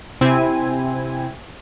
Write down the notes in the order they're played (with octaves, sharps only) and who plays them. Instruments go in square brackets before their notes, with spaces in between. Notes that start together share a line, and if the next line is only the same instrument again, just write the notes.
[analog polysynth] C3 C4 E4 G#5